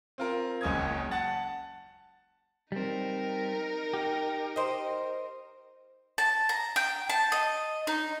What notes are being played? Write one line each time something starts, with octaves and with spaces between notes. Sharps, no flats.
C4 F4 A#4
F#1 C#2 C#4 D#6 G#6
F#5 A5 A6
G3 C4 D#4 A#4
G4
C5 D#5
A5
A#5
G5
A5
D#5
D#4